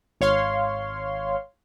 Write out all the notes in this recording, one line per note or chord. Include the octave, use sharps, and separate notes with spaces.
G#1 C#5 F5 C6